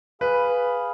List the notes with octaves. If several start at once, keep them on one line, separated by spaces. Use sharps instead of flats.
G#4 B4 F5 B5